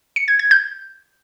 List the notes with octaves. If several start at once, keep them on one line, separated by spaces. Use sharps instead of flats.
C#7
G#6
G#6
G6